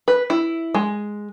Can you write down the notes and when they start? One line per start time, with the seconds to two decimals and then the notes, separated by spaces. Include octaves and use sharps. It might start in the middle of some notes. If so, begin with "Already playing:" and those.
0.08 B4
0.30 E4
0.74 G#3